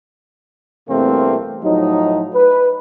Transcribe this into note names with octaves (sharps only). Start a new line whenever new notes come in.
E2 G2 C3 A3 A#3 C4
A2 F3 F#3 D#4
B4